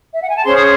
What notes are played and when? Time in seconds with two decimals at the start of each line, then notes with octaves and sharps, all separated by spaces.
0.14 E5
0.22 F#5
0.29 G#5
0.37 A5
0.45 C#4 G#4 C5 C6
0.56 D#6